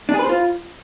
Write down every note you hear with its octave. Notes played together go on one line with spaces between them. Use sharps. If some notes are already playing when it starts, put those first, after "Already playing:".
D4
G#4
B4
C5
F4